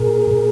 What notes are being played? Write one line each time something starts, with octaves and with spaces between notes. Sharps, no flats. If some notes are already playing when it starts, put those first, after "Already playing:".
Already playing: A#2 G#4 A#4
A#2